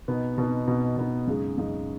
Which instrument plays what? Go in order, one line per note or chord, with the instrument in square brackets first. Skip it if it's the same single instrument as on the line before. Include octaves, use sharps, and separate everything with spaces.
[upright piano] B2 B3 D#4
B2 B3 D#4
B2 B3 D#4
B2 B3 D#4
F#2 C#3 G#3 D#4
F#2 C#3 G#3 D#4